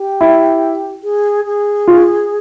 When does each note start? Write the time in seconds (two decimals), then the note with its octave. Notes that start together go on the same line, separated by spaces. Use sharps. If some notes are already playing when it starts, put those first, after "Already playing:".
Already playing: G4
0.21 E4
1.03 G#4
1.46 G#4
1.88 F4